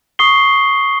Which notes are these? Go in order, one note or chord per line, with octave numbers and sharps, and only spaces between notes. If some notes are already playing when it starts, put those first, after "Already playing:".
C#6 D#6 C7 G7